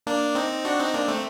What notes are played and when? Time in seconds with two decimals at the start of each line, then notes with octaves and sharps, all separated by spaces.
0.07 A#3 D4
0.35 C4 D#4
0.65 D4 F#4
0.79 C4 D#4
0.94 A#3 D4
1.08 A3 C4